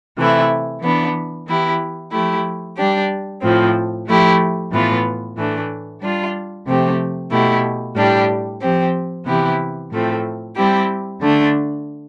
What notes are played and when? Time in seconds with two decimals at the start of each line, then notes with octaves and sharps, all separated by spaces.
0.18 C3 E3 A3 E4
0.82 E3 B3 D4
1.47 E3 B3 E4 G4
2.12 F3 A3 E4 G4
2.77 G3 D4 G4
3.42 A2 F3 C4
4.07 F3 A3 E4 G4
4.72 A2 E3 B3 F4
5.37 A2 E3 A3 D4
6.02 G3 D4 F4
6.66 C3 F3 A3 C4 G4
7.31 B2 A3 E4 G4
7.96 A2 G3 D4 G4
8.61 F3 C4 G4
9.26 C3 E3 B3 E4 G4
9.92 A2 F3 A3 C4
10.56 G3 C4 E4 G4
11.21 D3 A3 D4